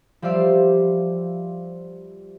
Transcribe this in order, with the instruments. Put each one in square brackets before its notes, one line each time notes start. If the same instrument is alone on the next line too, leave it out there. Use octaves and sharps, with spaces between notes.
[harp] F3 G3 C5 D5 E5 F5